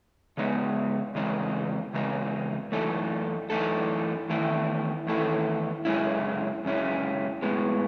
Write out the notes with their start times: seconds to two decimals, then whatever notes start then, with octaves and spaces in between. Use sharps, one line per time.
0.37 C#3 G#3 B3 D#4
1.15 E2 C#3 G#3 D#4
1.94 E2 C#3 G#3 D#4
2.72 F#2 E3 A3 D#4 A4
3.50 F#2 E3 A3 D#4 A4
4.28 E2 D#3 A3 E4 A4
5.07 E2 D#3 A3 E4 A4
5.85 F#2 C#3 G#3 C#4 E4
6.65 F#2 C#3 G#3 C#4 E4
7.42 A2 G#3 B3